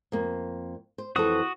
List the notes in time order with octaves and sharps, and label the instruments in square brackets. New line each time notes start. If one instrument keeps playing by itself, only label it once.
[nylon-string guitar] F2 A#3
C5
[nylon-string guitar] F2 E3 A4 [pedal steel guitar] F#4 D#6